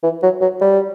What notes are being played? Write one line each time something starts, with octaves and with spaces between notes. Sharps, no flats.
E3
F#3
F#3
G3